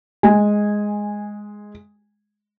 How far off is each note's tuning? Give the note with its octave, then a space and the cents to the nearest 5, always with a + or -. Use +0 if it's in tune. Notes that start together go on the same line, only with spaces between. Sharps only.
G#3 +0 G#5 -10